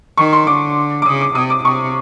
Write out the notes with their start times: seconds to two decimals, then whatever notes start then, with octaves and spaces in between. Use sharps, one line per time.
0.17 D#3 C#6
0.33 C6
0.47 D3 D6
1.02 D6
1.06 C#3 D#6
1.21 D6
1.35 C3 D#6
1.50 D6
1.64 C3 C#6